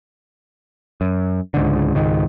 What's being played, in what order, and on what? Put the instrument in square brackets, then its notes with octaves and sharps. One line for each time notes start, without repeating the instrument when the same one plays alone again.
[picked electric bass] F#2
C#2 G#2 D3
C#2 G#2 D#3